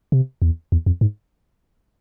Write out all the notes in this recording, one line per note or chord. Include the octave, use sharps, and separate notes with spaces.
C3
E2
E2
F2
G#2